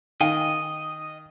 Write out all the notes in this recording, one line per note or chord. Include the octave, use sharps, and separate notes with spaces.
D#3 D#5 F5 G5 G#5